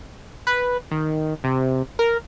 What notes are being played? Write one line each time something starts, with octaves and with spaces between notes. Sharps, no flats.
B4
D#3
C3
A#4